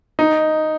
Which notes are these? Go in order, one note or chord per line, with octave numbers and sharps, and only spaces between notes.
D#4